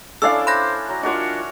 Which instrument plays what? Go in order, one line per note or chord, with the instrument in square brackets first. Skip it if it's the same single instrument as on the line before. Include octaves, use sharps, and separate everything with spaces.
[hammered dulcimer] C#4 D4 E4 [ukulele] A4 D5 F5 [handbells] E6
[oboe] C5 [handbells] B5 F#6 A#6
[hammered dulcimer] F#3 [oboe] A#5
[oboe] D4 [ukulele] F4 A#4 D#5 [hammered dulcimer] F#4 C#5